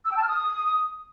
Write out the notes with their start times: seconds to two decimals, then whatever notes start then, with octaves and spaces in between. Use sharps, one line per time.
0.05 E6
0.11 G5
0.16 A5
0.22 F6
0.28 D#6